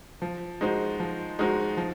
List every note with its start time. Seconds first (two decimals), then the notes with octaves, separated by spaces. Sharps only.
0.22 F3
0.61 G#3 D#4 F#4 C5
1.00 F3
1.39 G#3 D#4 F#4 C5
1.77 F3